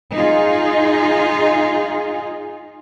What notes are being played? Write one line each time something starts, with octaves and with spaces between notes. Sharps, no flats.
D#4 F4 G#4